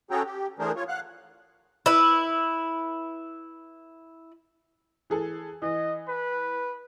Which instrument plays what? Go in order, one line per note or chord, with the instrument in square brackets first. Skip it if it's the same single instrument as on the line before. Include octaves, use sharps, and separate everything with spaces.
[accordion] C#4 F#4 G#4 A4 G5 A#5
G4
E3 A3 D4 G#4 A#4 C5
F4 C#5
F5 F#5 F#6
[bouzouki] E4 B4
[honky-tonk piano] E3 G#4 A4
[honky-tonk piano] E3 [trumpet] D#5
[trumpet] B4